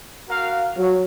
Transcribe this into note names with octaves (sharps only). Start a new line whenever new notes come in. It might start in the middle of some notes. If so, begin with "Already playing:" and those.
F#4 A#4 F5
F#3